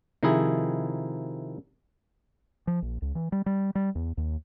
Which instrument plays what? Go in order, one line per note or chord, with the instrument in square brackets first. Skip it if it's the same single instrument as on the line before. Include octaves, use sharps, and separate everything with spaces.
[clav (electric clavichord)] C3 D#3 F3 D#4 E4 G#4
[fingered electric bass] F3
A#1
C#2
E3
G3
G3
G3
E2
D#2